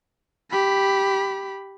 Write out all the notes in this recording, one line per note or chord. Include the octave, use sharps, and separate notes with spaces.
G4 B5